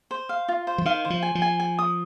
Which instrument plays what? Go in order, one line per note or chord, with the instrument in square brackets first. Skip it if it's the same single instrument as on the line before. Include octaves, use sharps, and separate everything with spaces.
[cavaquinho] C5
F5
F4
C5
[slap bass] F3
[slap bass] D#3 [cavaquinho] F5
[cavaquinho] C5
[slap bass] F3
[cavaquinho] G#5
[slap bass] F3
[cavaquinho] G#5
G#5
D#6